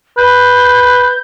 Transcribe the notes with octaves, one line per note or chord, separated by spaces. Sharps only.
B4 G6